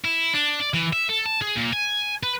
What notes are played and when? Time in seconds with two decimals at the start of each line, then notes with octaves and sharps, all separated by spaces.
0.05 E4
0.34 D4
0.60 D5
0.74 E3
0.93 E5
1.09 A4
1.26 A5
1.42 G#4
1.56 A#2
1.73 G#5
2.23 B4